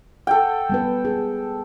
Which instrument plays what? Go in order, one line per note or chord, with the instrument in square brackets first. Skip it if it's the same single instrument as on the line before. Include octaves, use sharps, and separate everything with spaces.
[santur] A4 G5
[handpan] G3 B3 B4
G#4